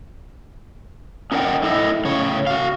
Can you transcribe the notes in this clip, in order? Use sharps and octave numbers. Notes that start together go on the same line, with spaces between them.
C#4 D#4 A#4 D5 F#5 G5
A3 E4 A4 D#5
A2 C#3 C#5
F#4 F5